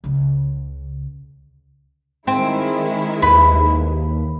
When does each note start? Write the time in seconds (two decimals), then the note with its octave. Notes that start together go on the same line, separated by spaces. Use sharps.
0.04 C#2 C#3
2.27 D#3 G#3 C4 E4
3.22 D#2 B4